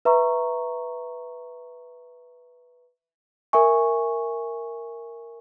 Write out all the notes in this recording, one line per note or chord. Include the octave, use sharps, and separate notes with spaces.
B4 E5 A#5 C#6
A#4 E5 G#5 C#6